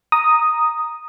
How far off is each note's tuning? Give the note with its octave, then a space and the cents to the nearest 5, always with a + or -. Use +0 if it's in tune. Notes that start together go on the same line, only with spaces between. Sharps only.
A#5 +0 D#6 +0